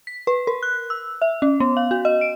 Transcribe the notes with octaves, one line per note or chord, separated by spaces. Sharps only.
B6
B4
A#4
F#6
E6
E5
C#4
B3
F5
F#4
D#5
D7